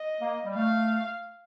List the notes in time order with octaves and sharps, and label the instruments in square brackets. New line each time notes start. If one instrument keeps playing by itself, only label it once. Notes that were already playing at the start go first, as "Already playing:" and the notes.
Already playing: [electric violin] D#5
[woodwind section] A#3
G3
[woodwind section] A3 [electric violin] F5